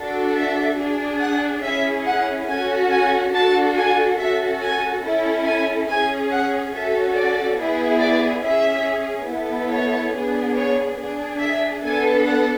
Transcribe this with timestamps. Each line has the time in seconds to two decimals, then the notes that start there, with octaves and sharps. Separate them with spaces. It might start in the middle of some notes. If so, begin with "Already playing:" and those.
Already playing: D4 F#4 A4
0.36 E5
0.78 D4 G#4
1.21 F#5
1.63 C#4 E4 G#4 E5
2.06 F#5
2.48 C#4 F#4 A4 G#5
2.90 G#5
3.33 D4 F#4 A4 A5
3.75 G#5
4.18 C#4 F#4 A4 E5
4.61 G#5
5.03 C#4 E4 A4
5.45 G#5
5.89 C#4 G#4 G#5
6.31 F#5
6.73 C#4 F#4 A4 E5
7.15 D5
7.59 B3 E4 G#4
8.00 D5
8.44 C#4 G#4 E5
9.28 B3 E4 A4
9.71 C#5
10.13 B3 D4 G#4
10.56 C#5
10.98 D4 G#4
11.40 E5
11.83 B3 D4 A4 G#5
12.26 F#5